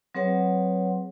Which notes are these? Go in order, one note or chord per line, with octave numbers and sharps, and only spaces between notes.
F#3 C4 G#4 B4 C#5 F#5